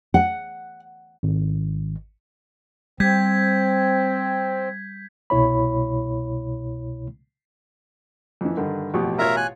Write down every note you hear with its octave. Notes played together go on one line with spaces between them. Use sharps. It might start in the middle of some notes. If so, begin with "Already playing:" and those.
F#5
G#1
G3 C4 G6 G#6 B6
C2 B2 E4 C#5 B5
F2 E3
G2 D3 D#3
A1 F2 B2 G4 C#6
F4 A#4 C#5 E5 A#5
G#5 F#6